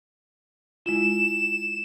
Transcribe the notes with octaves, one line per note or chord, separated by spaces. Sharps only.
G#3 E4 F4 E7